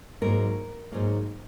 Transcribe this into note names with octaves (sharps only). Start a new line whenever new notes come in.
G#2 F#3 A#3 A#4
G#2 F#3 A#3